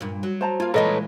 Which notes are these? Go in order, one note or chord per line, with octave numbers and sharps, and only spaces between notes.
G2 A#2
F#3
C5 A5 A#5
A#3 F4 F5
A#2 E3 G#3 A4 B4 C#5 D#5 A#5